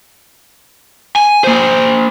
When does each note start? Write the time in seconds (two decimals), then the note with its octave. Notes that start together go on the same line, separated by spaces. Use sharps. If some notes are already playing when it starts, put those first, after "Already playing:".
1.16 G#5
1.44 A#3 C5